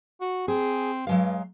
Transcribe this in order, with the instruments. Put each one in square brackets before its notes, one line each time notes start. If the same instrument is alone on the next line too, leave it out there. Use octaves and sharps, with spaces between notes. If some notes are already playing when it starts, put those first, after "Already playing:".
[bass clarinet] F#4
[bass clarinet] C4 [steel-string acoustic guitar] G#4
[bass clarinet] G2 [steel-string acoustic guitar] F#3 G#3 F5